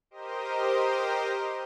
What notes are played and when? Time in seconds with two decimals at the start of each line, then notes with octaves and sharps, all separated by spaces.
0.11 G4 A#4 C5 D#5